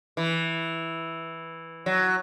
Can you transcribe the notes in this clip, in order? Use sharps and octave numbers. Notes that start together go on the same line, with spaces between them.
E3
F#3